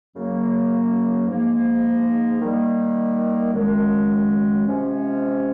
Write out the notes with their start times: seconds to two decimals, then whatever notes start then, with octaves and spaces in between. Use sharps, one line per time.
0.16 F#2 C#3 F#3 A#3
1.28 G#2 F3 A#3
2.41 D#3 G3 A#3
3.53 F#2 D#3 G#3
4.66 C3 F3 G#3 C#4